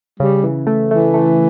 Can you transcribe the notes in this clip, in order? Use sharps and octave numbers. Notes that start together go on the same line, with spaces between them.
C#3 G3
E3
A3
E3 A3
A3